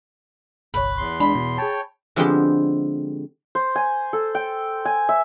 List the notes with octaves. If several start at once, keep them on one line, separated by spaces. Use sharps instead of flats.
G1 C2 B4 C#5
E2 C6
G#3 D4 G#4 B5
B2
G#4 C#5 G5 A5
D3 F3 G#3 B3 C4 G4
C5
G#5
A4
G5
G#5
E5